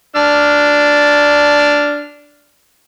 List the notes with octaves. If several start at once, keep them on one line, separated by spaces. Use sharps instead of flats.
D4 F6